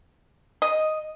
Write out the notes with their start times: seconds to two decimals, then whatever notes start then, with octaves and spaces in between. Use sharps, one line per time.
0.62 D#5